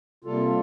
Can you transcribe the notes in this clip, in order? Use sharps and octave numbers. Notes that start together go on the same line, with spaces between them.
C3 G3 A#3 F4 A4